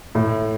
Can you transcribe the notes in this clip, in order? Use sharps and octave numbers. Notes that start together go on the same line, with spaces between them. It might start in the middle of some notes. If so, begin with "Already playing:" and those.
A2